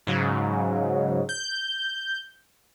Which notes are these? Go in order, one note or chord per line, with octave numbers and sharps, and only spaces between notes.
G#2 C#3 F#3
G6